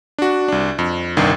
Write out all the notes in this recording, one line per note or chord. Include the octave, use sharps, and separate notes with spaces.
D4 F#4
C2 D4
F2
G1 C2 D#3 D4